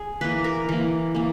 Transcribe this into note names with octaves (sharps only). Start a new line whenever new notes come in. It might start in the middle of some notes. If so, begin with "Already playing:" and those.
Already playing: G#4
E3 A#3 B4
A#4
E3 A#3
E3 A#3